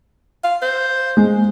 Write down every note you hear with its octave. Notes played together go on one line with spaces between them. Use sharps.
F5
C5
G#3